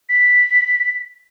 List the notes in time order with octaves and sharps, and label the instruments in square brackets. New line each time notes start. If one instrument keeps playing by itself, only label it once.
[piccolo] B6